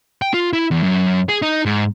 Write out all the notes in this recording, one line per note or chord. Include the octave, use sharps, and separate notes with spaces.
G5
F4
E4
E2
F#2
G#4
D#4
G#2